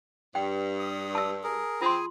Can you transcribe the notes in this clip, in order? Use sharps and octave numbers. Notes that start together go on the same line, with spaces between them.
G2 G5
D#6
A5 E6
G#4 A#4
C4 F4 G#4 G#5 C6